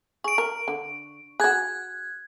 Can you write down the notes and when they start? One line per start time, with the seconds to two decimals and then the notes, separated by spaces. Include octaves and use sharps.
0.24 G#4 C#6 D7
0.38 A#4
0.68 D3
1.40 F#4 G#4 F#6 G#6